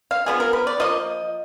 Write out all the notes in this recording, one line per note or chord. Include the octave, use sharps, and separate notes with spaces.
F5
F3 B3 G#4
A#4
B4
D5
F3 A#3 D#5